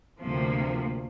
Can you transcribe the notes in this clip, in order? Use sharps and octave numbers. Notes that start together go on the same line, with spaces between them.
D2 C3 F3 A#3